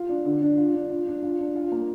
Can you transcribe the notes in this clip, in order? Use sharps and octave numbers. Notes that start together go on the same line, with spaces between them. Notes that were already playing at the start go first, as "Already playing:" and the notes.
Already playing: F4
D4
D3
D4
F4
D4
F4
D4
F4
D4
F4
A#3